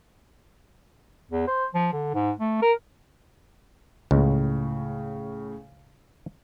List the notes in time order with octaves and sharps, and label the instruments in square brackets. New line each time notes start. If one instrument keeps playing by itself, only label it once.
[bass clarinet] E2
C5
F3
D3
G#2
A3
A#4
[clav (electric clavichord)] C#2 [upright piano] A2 C#3